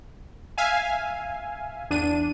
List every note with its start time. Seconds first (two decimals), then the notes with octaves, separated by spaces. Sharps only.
0.58 E5 F5 G#5
1.90 E2 D4 D#7